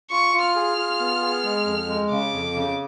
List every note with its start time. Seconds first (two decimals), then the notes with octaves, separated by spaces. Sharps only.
0.11 F4 C#6
0.34 F4
0.45 F6
0.56 G#4
0.77 F4
1.00 B3
1.22 G#4
1.44 G#3
1.66 F2
1.89 G#3
2.11 C#3 D6
2.34 F2
2.55 C#3